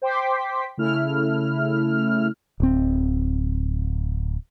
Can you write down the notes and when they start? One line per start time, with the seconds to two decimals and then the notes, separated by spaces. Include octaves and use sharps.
0.02 C5 G5 C6 D6 B6
0.77 C#3 A3 E4 F6
2.60 D1 C4